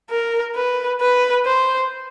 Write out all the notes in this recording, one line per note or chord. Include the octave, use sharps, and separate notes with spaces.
A#4
B4
B4
C5